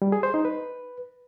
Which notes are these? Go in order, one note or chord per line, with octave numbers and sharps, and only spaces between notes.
G3
G#4
C5
D#4
B4